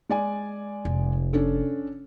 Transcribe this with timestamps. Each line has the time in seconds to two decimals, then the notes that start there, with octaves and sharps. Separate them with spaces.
0.09 G#3 D5 G#5
0.85 F1
1.33 C#4 D4 A4